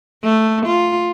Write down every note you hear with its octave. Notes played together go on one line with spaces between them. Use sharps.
A3
F4